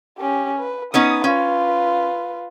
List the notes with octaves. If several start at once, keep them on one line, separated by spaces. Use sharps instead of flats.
C#4 G4
B4
B3 C#4 D#4 D#6
C#4 F4 B4